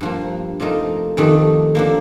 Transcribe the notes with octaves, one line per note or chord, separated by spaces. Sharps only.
G2 F3 A#3 F4
C3 F3 A3 D#4 A#4
F2 C3 D#3 A3
D3 F3 A#3